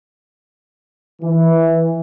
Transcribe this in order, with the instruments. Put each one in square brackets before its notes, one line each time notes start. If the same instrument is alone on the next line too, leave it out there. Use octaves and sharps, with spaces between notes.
[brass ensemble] E3